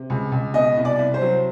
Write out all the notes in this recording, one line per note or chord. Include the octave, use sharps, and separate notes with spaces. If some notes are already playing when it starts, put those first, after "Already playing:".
Already playing: C3
C#2
C#2
B2 D#5
C2
D5
C2
C5
F#3